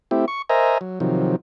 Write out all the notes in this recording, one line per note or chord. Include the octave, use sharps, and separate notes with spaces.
A3 C4 E4 G4
C#6
A#4 C5 D#5 E5 G#5 A#5
F#3
C3 D#3 F3 F#3